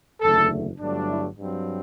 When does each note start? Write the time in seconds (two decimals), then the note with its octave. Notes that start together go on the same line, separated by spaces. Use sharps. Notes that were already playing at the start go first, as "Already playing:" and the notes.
0.20 F#1 E2 D3 A3 A4
0.79 G1 G2 F#3 A3 D4
1.10 E4
1.39 G2 F#3 C4